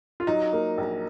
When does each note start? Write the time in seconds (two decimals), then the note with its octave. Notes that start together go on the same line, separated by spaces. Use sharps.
0.20 F4
0.27 F#3 D#4
0.53 A#3
0.78 A#1